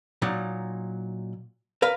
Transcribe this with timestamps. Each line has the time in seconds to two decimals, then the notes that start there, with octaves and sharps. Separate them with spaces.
0.22 A#2 F#3 D#4
1.82 A#4 B4 F5